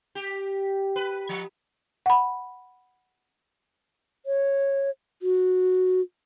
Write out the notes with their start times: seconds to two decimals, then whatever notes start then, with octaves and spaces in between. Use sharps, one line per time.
0.15 G4
0.96 B4
1.29 F3
2.06 F#5 B5
4.26 C#5
5.22 F#4